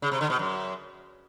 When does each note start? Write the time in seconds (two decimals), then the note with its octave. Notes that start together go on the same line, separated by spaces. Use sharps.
0.02 C#3
0.12 C3
0.21 D3
0.30 B2
0.39 F#2